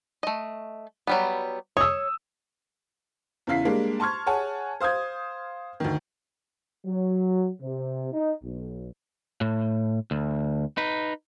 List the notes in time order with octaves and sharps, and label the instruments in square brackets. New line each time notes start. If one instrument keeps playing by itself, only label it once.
[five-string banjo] A3 D#5
F#3 G3 B3
[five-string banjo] C#5 [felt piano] D#6 E6
[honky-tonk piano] E2 C#3 E4 F5 B6 C7
G3 G#3 A#3 D4
A5 C6 C#6 F6 G#6
G#4 C#5 F#5 G#5 A5
C5 F5 D#6 G6 G#6
D2 D#3
[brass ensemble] F#3
C3
D#4
B1
[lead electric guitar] A2
D2
D#4 B4